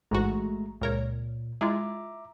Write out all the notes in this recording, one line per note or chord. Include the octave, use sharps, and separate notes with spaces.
A1 G#2 G#3 A3 F#4 A#5
C#2 A#2 A#4 C#5
G#3 E4 F4 E5 A#5 D6